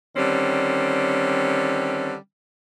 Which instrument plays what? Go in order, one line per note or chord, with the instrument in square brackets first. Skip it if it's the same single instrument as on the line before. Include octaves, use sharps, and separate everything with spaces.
[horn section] D3 D#3 G3 C4 C#4